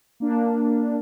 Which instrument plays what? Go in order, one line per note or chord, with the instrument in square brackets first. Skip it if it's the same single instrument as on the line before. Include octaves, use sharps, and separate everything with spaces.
[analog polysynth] A#3 D4